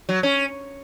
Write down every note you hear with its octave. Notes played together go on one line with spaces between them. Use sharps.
F#3
C#4